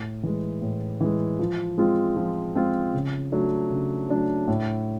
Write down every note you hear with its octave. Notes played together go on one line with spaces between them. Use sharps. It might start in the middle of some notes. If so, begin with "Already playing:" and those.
Already playing: A2
E3 G#3
A2
E3 G#3
F3
G#3 C4 F4
F3
G#3 C4 F4
C#3
F#3 A3 D4
C#3
F#3 A3 D4
A2